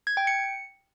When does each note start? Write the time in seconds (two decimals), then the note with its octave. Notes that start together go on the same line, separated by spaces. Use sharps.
0.07 G#6
0.17 G5
0.27 C#7